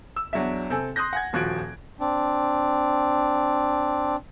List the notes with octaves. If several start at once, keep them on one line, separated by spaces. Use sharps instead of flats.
E6
E2 F#3 D4 E5
C3 C4 A4 G#5
C6 D#6 F#6 G6 A#6
F#5 G#5 G#6
D#1 F3 F#4 F#6 G#6 D7
C4 D4